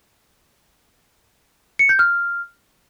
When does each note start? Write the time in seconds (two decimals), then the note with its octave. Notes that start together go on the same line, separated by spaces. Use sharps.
1.79 C#7
1.89 G6
1.99 F6